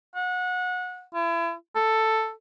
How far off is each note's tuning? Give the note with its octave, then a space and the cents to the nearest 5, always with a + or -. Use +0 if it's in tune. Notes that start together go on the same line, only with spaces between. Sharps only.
F#5 -25
E4 +35
A4 +5